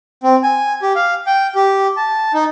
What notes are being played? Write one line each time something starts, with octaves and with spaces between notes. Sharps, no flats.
C4
G#5
G4
F5
G5
G4
A5
D#4